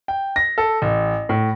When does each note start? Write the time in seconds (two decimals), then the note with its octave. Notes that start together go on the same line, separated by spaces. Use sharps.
0.08 G5
0.36 A#6
0.58 A4
0.82 A1
1.29 A2